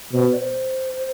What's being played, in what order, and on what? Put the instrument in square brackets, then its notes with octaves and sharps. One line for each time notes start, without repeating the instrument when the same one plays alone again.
[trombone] B2 [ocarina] C5
[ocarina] B4
D5
C5